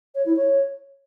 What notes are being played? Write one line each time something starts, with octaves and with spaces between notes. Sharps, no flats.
C#5
E4
C#5